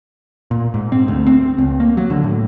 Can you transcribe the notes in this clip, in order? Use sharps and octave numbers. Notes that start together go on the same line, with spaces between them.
A#2
G#2
C4
D2
C4
C#2
A#3
F#3
D3
A2